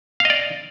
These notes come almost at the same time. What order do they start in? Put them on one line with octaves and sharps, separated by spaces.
F5 D#5 D5